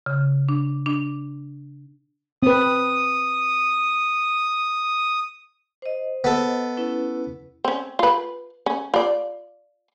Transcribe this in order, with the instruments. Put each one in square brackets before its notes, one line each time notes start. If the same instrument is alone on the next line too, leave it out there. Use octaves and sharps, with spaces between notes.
[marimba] C#3
D4
D4
[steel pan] C4 B4 [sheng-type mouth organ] D#6
[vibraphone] C5 D#5
[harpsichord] B3 A4
[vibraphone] C#4 E4 B4
[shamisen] C4 C#4
F4 B4
C#4
F4 D5